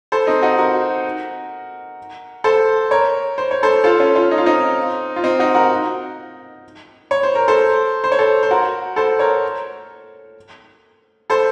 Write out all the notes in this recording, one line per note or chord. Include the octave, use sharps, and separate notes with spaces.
A4 C5
C4 D#4
D#4 F#4
F#4 A#4
A4 C5
A#4 C#5
C5
C#5
A4 C5
F4 A4
C#4 F4
C#4 F4
D#4
F4
C4 D#4
F4
C4 D#4
D#4 F#4
F#4 A#4
C#5
C5
A#4
A4 C5
C5
C#5
A4 C5
C5
F#4 A#4
A4 C5
A#4 C#5
A4 C5